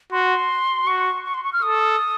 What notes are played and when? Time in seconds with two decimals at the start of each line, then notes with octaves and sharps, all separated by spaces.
0.12 F#4 C6
0.87 F#4 C#6
1.25 C#6
1.34 C6
1.44 C#6
1.53 F6
1.62 A4 D#6